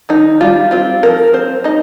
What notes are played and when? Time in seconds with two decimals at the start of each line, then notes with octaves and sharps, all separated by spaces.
0.09 D#3 D#4
0.41 G3 F4
0.71 C4 F4
1.03 F3 A#4
1.33 C4 C5
1.64 D#4 D#5